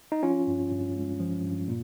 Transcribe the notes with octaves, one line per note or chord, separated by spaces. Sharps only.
D#4
F3 C#4 F4
G2
G2
G#3
F3
G2
A#2